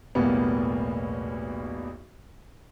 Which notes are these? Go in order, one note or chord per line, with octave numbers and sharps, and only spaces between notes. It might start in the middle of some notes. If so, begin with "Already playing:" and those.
B1 E2 A2 G3 A#3 B3